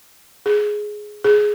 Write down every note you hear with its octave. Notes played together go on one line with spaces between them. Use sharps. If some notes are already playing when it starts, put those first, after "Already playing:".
G#4
G#4